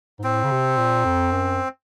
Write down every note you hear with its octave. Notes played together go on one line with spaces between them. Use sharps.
G#2
A2 C4
C#3
C3
A#2
F2
F#2